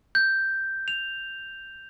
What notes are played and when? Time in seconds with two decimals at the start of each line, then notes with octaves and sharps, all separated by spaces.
0.15 G6
0.88 F7